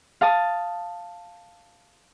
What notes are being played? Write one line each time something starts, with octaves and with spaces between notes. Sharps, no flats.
F5 A5 D#6